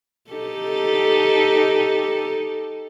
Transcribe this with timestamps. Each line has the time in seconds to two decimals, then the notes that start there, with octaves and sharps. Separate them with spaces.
0.31 D#4 G4 A4